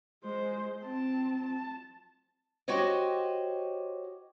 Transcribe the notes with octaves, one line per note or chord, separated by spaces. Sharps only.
G#3 C5
C4 A5
A5
F#4 G4 C5 C#5 D#5